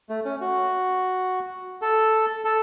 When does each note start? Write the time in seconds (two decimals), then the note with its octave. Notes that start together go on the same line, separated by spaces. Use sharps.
0.09 A3
0.25 C#4
0.41 F#4
1.82 A4
2.44 A4